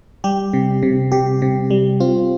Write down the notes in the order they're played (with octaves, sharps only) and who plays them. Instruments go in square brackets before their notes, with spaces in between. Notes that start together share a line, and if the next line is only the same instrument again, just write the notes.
[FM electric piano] G3 G4
C3
C3
C3 G4
C3
G3
C4 F4